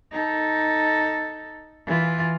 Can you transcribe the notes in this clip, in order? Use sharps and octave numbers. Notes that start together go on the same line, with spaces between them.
D#4 A4
E3 F4